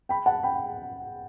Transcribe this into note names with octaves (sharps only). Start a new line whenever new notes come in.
G5 B5
F#5 A5
G5 B5